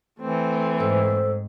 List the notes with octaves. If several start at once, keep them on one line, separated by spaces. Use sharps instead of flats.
E3 A3 C4
G#2 A4 C5 E6